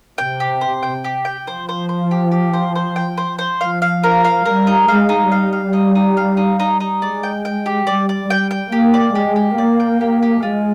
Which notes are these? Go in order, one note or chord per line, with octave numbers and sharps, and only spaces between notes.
C3 G5
G4
C5
G5
G4
G5
F3 C5
C5
C5
G4
G4
C5
C5
G5
C5
C5
F3 F5
F5
A#4
F5
G3 A#4
D#4
G#3 F5
D#4
G3 F5
F5
D#4
D#4
F5
D#4
D#4
D#4
G#3 D5
G5
G5
G4
G3 D5
D5
G3 G5
G5
A#3 G4
D5
G#3 G4
G4
A#3 D5
G5
G4
G4
G#3 F4